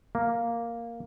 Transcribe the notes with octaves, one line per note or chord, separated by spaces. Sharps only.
A#3